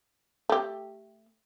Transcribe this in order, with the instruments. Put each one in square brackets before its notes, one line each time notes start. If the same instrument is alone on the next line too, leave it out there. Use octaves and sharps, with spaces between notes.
[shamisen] A3 G4